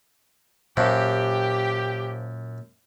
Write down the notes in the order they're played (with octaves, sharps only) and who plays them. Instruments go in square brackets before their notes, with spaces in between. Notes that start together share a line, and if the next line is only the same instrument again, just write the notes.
[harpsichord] F#2 [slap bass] A#2 [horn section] G4 [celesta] C5 F5 A5